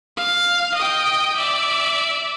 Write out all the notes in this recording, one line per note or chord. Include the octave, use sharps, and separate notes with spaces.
F5
D#5 G5
D5 E5